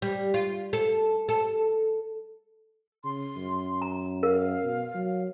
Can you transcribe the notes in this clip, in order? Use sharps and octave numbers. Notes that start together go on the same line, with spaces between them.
G3
F4
A4
A4
C#3 C6
F#2
A#5
A#4 F5
B2
F#3